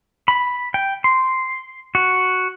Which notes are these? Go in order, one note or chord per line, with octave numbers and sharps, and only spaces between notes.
B5
G5
C6
F#4